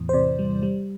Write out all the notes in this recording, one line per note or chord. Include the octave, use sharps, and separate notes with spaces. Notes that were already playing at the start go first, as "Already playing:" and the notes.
Already playing: E2 A2 E3
C5
C3 D5
G3
G3